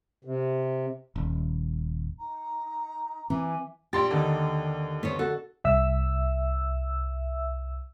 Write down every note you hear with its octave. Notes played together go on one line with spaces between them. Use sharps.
C3
D#1
D#4 A#5
E3 C4 G#5 D6
A#1 G4 C6 A6
D#2 D3 D#4
B3 C5 C#5
F#4 A4
C2 E5 E6